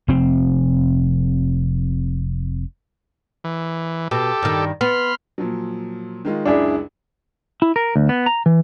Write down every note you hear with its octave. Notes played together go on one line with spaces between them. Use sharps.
F1 C4
E3
B2 G4 A4
G2 D#3
B3 B5 C6 F6
A#2 F3 F#3
D#3 G#3 F4
C#2 F#2 D4 E4 G#4 D5
E4
A#4
D2
B3
A#5
E3